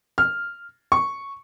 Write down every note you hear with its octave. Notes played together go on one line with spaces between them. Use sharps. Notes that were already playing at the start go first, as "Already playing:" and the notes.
F6
C#6